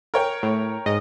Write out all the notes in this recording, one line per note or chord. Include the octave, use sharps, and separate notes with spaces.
A#4 C#5 G5
A2
G#2 D#5